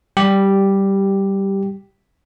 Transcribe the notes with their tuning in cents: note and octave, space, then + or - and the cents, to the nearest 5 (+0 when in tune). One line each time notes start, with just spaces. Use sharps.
G3 -10 G4 +0